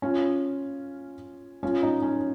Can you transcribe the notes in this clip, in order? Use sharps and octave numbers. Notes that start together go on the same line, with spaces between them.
C#4 F4
C#4 F4
D#4
C#4